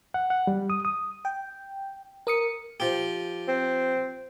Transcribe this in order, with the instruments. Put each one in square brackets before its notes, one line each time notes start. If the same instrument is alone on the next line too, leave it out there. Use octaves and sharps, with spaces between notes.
[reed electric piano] F#5
F#5
G3
D#6
D#6
[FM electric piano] G5
A#4 D#6 C#7
[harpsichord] F3 G4
[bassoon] C4